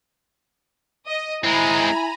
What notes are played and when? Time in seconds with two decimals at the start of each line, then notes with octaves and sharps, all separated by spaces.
1.07 D#5
1.44 G#3 C4 E4 G#5 A#5 B5